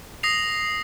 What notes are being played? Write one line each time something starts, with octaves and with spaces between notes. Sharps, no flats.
D#6 A#6 C7 F7